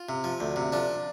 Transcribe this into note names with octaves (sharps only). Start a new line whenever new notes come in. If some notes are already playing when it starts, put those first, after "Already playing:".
Already playing: F4
C3
F3
D2
C3
F3 D4